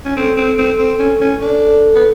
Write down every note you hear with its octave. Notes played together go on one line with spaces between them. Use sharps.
C#4
C4 A4
C4
C4
C4
C#4
C#4
D4 A4
B3